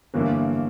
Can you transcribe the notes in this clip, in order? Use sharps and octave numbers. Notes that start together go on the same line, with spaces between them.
G1 G2 E3 A#3 E4